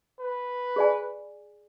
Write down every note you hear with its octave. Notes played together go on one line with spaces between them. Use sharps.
B4
G#4 D5 G#5